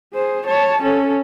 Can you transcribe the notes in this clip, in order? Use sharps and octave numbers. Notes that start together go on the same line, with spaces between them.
G#4 C5
C#5 A5
C#4 A4